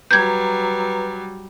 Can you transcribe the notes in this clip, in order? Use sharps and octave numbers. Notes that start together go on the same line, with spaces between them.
F#3 G3 B4 A#5 G6 G#6